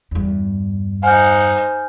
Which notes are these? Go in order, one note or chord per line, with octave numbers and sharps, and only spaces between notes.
E2 G2
D#4 C5 F#5 G#5 F6 G6